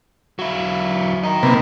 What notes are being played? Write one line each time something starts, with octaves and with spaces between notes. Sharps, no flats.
F#3 E4
D#4 A#4
C3 A#3 B3